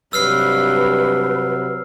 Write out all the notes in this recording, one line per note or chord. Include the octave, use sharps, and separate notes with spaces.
G2 C3 F#3 B4 E6 F6 C7